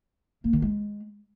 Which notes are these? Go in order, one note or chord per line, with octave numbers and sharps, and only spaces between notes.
A#3
D#3
G#3